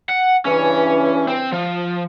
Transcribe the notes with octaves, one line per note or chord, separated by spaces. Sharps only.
F#5
G2 C#3 E3 C#4
C4
F3